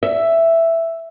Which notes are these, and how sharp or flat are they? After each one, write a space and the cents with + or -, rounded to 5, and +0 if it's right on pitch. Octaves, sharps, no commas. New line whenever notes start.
E5 +5